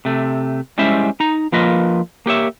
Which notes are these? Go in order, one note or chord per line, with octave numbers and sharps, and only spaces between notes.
C3 A3
G3 G#3 C#4 E4 C5 E5
D#4 A#5
F3 A#3 F4 B4 D#5
A#3 G4 C#5 E5